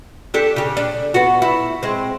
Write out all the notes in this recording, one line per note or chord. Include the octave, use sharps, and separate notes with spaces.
D4 G4 A4
C#3 G4
D4
B3 F#4
E4
G#3 C4